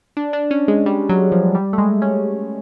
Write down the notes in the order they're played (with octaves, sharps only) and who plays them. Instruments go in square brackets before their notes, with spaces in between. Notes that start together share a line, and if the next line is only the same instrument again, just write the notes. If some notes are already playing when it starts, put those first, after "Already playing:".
[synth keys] D4
D4
C#4
G#3
G3
F#3
F3
G3
A3
G#3
C#4